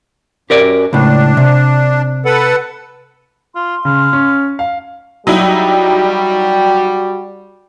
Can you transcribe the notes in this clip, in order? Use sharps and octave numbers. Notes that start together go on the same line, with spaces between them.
F#2 G4 A#4 D5
C#2 A2 D4
C3
A4 B4 F#5
F4 C6
C#3 F5
C#4
F5
F#3 G3 D#4 E4 F#4